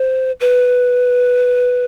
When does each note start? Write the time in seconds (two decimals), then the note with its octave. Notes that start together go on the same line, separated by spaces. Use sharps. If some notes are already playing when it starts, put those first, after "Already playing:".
Already playing: C5
0.40 B4